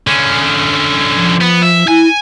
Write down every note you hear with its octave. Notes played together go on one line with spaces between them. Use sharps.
D3 C#4
F3
B3
E5
E4 G#5